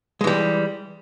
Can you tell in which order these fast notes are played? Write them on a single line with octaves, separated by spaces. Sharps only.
G#3 E3 G3